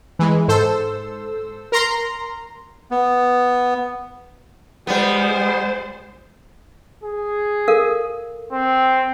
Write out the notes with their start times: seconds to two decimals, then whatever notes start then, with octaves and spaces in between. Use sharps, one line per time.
0.19 E3 G#3
0.48 G#2 A4 C5 E6
1.72 A#4 A#5 C6
2.91 B3
4.87 G3 G#3 B3 C5
7.04 G#4
7.68 A4 A#4 F5
8.52 C4